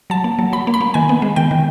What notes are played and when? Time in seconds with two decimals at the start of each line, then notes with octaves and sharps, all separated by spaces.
0.10 F#3 A5
0.24 A#3
0.39 F#3
0.53 F#3 B5
0.67 A#3
0.74 B5
0.81 A#3
0.94 D#3 G#5
1.09 B3
1.22 G#3
1.36 D#3 G5
1.51 D#3